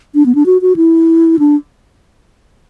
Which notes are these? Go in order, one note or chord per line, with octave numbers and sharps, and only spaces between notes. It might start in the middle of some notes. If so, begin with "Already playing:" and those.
D4
B3
D4
F#4
F#4
E4
D4